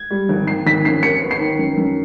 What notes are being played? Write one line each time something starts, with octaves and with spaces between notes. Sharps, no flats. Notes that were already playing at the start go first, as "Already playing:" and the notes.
Already playing: G#6
G3
G#1
D#3 C7
G#1 B6
F#2 C7
D#2 C#7
B3
C7
D#3
F#2
F#2